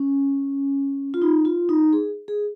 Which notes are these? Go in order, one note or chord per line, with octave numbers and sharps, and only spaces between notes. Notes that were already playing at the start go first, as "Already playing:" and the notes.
Already playing: C#4
F4
D#4
F4
D#4
G#4
G#4